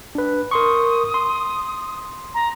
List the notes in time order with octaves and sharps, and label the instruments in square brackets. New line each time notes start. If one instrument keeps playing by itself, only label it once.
[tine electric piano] D4 B4
[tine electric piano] A#4 C6 C#6 [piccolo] D#6
[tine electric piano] C6
[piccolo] A#5